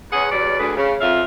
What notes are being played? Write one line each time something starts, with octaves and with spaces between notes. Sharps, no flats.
E2 C#4 G#4 F#5
E2 F#3 G3 D5
D2 D3 G#4 B4
C#3
F2 F4 E5 F5